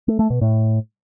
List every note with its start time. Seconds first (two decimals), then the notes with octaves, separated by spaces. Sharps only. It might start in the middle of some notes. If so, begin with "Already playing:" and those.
0.08 A3
0.19 A3
0.30 B2
0.41 A2